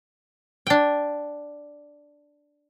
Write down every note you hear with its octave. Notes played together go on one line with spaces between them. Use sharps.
D4 G5